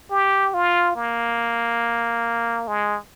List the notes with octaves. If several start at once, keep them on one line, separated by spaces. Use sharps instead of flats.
G4
F4
A#3
G#3